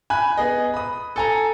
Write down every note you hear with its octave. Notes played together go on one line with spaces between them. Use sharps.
G#5 B5 F#6
B3 G#4 D#5
B5 D#6
A4 G#5 A#5